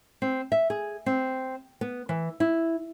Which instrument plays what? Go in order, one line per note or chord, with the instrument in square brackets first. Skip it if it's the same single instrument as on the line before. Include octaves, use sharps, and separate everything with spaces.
[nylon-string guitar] C4
E5
G#4
C4
B3
E3
E4